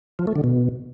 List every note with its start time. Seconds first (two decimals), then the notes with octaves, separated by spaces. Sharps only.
0.19 F3
0.27 A3
0.36 D3
0.44 B2